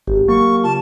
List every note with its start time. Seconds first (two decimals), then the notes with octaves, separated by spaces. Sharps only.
0.07 G#1 G4
0.29 F#3 A#3 C#6
0.64 C#3 F4 A5